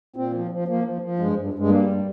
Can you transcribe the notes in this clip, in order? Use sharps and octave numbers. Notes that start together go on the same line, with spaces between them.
A#2 C4
F3
F3
F3 A#3
F3
F3
G2 G#3
G2
G2
G#3
G3 A#3
G2